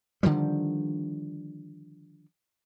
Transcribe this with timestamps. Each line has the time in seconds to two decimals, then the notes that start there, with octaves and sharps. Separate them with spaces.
0.23 D3 D#3 F3 G3